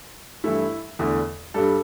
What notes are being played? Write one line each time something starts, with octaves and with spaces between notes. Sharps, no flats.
G2 E3 A3 E4
E2 D3 A3
G2 G3 A4